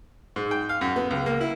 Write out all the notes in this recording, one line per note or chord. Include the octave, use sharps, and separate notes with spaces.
G#2
G5
F5
F#2
B3
C#2
A#3
E4